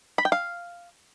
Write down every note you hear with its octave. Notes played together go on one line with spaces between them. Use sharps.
B5
G5
F5